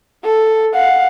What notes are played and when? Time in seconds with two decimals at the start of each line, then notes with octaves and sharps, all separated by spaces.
0.25 A4
0.74 F5 F#5